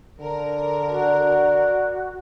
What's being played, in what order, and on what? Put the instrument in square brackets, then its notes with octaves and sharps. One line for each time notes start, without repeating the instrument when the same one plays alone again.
[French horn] D3 [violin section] A#4
[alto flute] F#4 [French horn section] D5